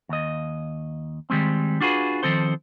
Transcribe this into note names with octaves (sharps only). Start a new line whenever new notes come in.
D#2 D#5
D#3 G3 G#3 C4
D4 F4 F#4 G#4 B4
D#3 F3 C4 A4 C5